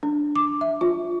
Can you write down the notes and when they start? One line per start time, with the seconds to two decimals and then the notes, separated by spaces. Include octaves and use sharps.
0.03 D4
0.36 D6
0.61 E5
0.81 F4